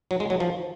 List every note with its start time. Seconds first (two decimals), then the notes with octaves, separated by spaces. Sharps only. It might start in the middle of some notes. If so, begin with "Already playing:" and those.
0.11 F#3
0.20 G#3
0.30 F#3
0.40 F3